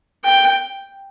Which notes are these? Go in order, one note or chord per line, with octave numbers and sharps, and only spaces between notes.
G5